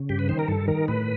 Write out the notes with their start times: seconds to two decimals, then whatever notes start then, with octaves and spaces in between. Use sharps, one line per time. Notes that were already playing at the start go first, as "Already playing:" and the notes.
Already playing: C#3
0.09 G2 G4
0.19 B4
0.29 D#3 C5
0.39 A#4
0.48 G2 A4
0.68 D#3 A#4
0.88 A2 B4